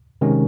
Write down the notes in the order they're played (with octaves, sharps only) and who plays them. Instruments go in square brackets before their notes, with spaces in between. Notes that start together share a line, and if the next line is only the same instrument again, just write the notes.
[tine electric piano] C3 D#3 G#3 C#4